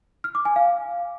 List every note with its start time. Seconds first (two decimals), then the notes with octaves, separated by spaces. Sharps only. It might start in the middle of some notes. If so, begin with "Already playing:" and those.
0.24 F6
0.35 D6
0.45 G#5
0.56 F5